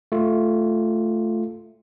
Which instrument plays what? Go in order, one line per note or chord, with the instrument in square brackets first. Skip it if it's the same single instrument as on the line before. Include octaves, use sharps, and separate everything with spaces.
[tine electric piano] A3 F4